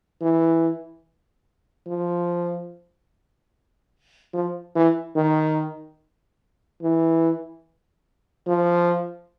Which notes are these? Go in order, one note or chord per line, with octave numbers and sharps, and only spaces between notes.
E3
F3
F3
E3
D#3
E3
F3